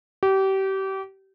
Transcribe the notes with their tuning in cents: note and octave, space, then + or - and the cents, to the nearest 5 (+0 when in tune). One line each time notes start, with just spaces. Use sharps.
G4 -30